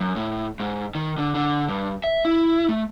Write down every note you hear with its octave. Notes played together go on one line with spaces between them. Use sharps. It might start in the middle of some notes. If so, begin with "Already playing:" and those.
F#2
A2
G#2
D#3
D3
D3
G2
E5
E4
A3